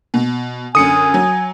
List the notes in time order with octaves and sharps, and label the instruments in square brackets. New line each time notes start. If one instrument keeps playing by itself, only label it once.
[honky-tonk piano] B2
[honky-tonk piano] F#2 D3 [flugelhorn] G#5 [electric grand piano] D#6 C#7
[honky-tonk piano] F#3